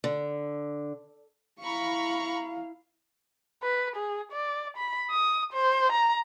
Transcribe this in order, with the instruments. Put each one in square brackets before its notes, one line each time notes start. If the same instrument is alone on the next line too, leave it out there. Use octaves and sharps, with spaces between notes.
[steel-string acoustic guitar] D3
[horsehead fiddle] E4 F5 [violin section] A#5 B5 C#6
[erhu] B4
G#4
D5
B5
D#6
C5
A#5